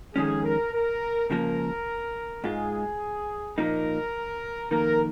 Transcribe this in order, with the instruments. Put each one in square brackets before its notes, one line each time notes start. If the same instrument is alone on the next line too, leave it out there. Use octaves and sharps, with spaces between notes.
[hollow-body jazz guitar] F2 D#3 G#3 C#4 [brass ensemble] G#4
[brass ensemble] A#4
A#4
[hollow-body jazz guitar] C#2 C#3 F3 A#3 [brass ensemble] A#4
[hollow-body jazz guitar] G#2 G#3 F4 [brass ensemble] G#4
[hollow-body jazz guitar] A#2 F3 A#3 D#4 [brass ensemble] A#4
[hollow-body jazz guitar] F2 D#3 A#3 [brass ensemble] A#4